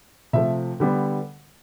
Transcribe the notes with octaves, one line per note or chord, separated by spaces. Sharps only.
C3 F3 A3 E5
D3 G3 B3